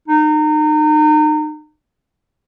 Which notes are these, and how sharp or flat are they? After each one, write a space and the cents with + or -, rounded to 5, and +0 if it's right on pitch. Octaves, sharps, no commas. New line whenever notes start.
D#4 -30